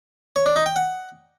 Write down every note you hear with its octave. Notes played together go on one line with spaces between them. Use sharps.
C#5
D4
D#4
G5
F#5